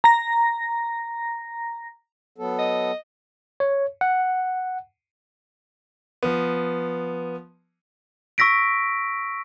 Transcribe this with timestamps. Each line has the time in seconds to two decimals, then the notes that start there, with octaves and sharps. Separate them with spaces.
0.04 A#5 A#6
2.38 F#3 B3 A4
2.59 D#5
3.60 C#5
4.01 F#5
6.23 F3 B3
8.38 C#6 E6 A#6 B6 D7